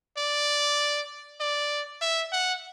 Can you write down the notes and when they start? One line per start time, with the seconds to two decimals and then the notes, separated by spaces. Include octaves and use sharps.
0.17 D5
1.40 D5
2.01 E5
2.32 F#5